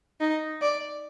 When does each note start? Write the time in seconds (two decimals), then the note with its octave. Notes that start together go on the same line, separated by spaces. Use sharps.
0.20 D#4
0.62 D5